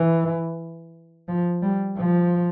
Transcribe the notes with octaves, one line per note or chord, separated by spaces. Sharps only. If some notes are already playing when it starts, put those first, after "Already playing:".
Already playing: E3
F3
G3
F3